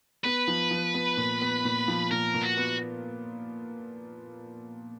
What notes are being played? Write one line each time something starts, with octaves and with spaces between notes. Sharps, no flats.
B3 B4
F3
F3
B3
A#2
B3
A#2
F3
A#2 A#4
A#2
F#4
B3